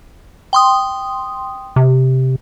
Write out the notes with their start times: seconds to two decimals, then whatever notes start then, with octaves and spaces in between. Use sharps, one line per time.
0.53 G5 C6 D#6
1.76 C3